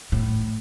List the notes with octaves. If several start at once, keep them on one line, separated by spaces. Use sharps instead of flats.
A2